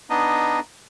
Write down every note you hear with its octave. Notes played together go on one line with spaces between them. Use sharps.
B3 D4 D#4 D#5